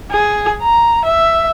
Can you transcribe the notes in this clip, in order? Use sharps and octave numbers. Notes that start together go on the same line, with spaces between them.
G#4
A#5
E5